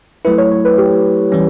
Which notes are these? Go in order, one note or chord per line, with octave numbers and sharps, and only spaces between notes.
F#3 A3 E4 B4
C#5
C#5
B4
G4
E3 G3 C#4